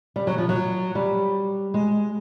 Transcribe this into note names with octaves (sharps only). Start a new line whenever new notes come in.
G3
F#3
F3
F#3
G3
G#3